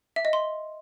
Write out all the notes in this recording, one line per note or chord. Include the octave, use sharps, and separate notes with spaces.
E5
D#5
C6